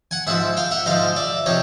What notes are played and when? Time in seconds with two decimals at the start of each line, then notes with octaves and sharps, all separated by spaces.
0.11 F#5 G#5
0.27 G#2 F3 E5 F#5
0.57 F5 G5
0.71 E5 F#5
0.86 G#2 F3 D#5 F5
1.16 D5 E5
1.46 C3 F3 C#5 D#5